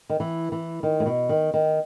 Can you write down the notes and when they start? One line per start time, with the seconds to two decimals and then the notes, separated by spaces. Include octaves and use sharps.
0.10 D#3
0.20 E3
0.52 E3
0.83 D#3
1.00 A2
1.06 B2
1.29 D#3
1.54 D#3